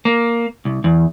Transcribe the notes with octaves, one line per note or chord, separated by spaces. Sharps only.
A#3
C2
E2